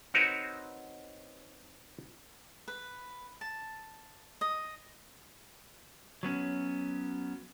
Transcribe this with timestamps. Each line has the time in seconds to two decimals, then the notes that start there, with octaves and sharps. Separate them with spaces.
0.14 C4 D#4 F#4 A#4 B4 C#5
2.68 B4
3.41 A5
4.41 D#5
6.23 F#3 B3 C#4